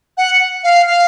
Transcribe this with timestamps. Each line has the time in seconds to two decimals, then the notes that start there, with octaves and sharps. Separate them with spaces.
0.17 F#5
0.64 F5
0.86 F5